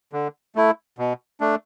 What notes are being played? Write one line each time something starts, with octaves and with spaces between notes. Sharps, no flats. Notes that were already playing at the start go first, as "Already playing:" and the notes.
D3
A3 E4
B2
A3 D4